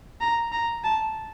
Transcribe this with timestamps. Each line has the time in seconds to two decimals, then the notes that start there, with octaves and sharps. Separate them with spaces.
0.21 A#5
0.52 A#5
0.84 A5